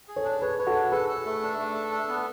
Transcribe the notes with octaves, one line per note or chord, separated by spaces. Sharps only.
G#4
A4 C#5
D4
G#4 B4 C#5
B4 C#5
F#4 A4
D4
G#4 A4 B4
A4
A3
D4
A3
A4
D4
B3